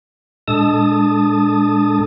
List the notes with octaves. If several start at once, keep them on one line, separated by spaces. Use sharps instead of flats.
A#2 G#3 D4 A4 A5 D#6